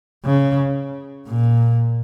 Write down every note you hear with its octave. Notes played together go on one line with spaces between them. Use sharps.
C#3
A#2